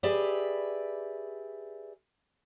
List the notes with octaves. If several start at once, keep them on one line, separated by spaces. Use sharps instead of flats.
G4 G#4 B4 D5 E5